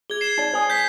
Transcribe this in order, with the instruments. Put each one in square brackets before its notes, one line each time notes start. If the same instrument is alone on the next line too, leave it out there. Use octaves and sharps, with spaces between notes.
[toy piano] G#4 [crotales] G#6 G7
[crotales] C7 E7
[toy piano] D#4 D5
C5 G#5 D#6
[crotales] G6 B6